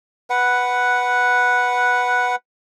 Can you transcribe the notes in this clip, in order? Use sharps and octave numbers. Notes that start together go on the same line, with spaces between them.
B4 F#5